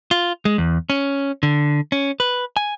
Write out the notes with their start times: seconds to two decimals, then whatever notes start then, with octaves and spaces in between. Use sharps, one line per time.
0.11 F4
0.45 G#3
0.58 E2
0.90 C#4
1.43 D3
1.92 C#4
2.20 B4
2.57 G#5